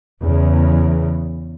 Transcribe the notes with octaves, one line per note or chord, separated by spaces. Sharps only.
E2 C#3